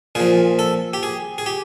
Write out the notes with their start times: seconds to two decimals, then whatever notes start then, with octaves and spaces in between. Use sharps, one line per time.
0.15 A#2 F3 G#4
0.59 A4
0.94 G4
1.03 G#4
1.38 G#4
1.46 G4